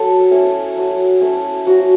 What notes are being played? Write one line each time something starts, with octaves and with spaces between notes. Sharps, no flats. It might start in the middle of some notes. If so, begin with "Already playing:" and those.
Already playing: F#3 A4
A3 C#4 E4
F#3
A3 C#4 E4
F#3 F#4